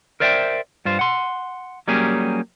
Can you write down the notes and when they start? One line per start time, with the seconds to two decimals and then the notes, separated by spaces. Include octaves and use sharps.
0.20 A#4 C5 D5 E5 F5 G5
0.85 G2 F4 C5
0.99 F#5 C6
1.88 F#3 G3 A#3 C#4 G4 G#4